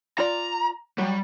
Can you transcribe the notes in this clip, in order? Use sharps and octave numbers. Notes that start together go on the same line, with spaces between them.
F4 D5 A#5
F#3 G3